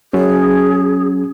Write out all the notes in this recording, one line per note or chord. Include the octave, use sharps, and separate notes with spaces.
F#3 C#4 G#4